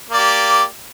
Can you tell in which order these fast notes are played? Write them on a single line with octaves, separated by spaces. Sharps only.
A#3 D5 G4